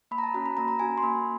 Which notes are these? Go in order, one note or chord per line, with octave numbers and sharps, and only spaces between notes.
A#3 B5
A#5
A5
C#4 F#4 A#5
B5
A#3 A#5
A#5
C#4 F#4 G#5
C6
A#3 B5